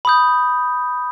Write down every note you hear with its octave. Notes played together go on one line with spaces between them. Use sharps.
B5 D#6 G6